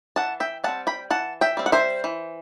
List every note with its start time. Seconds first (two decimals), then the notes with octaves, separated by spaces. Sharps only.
0.16 E3 F#5 A5
0.40 E5 G5
0.64 G3 C4 F#5 A5
0.87 G5 B5
1.10 E3 F#5 A5
1.41 E5 G5
1.57 G3 C4
1.66 F#5
1.72 C5 E5
2.04 E3